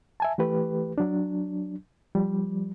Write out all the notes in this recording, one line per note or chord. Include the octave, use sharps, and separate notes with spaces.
E5 G#5 A5
E3 A3 G4 B4
F#3 D4
F3 G3